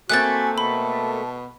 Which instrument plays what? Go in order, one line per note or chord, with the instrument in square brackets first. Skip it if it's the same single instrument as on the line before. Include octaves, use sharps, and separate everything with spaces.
[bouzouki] A3 A#3 C4 [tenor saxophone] F#4 [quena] G#5 [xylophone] F#6 A6
[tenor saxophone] B2 [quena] A5 [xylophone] B5